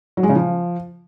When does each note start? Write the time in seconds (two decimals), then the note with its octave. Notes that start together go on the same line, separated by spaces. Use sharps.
0.17 F#3
0.23 G#3
0.29 C#3
0.35 F3